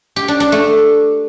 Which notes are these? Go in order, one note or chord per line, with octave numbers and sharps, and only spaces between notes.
G4
D4
D4
A3